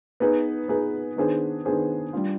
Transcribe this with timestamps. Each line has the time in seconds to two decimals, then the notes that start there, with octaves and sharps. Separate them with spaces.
0.20 B3 D#4 G#4 B4
0.68 B3 D#4 G#4 B4
1.16 D#3 B3 D4 G#4 C5
1.65 D#3 B3 D4 G#4 C5
2.13 G3 D4 F4